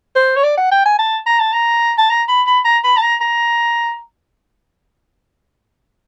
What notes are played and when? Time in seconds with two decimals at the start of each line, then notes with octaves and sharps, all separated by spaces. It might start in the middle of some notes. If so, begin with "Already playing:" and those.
0.16 C5
0.36 C#5
0.43 D5
0.58 F#5
0.72 G5
0.86 G#5
0.99 A5
1.27 A#5
1.40 A5
1.53 A#5
1.98 A5
2.10 A#5
2.29 B5
2.47 B5
2.65 A#5
2.84 B5
2.97 A5
3.02 A#5
3.21 A#5